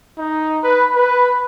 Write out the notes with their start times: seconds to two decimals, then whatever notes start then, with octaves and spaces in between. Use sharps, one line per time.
0.18 D#4
0.64 B4
0.95 B4